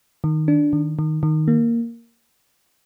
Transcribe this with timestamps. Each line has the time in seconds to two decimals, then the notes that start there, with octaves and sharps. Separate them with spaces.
0.24 D#3
0.48 D4
0.73 D#3
0.99 D#3
1.23 D#3
1.48 A#3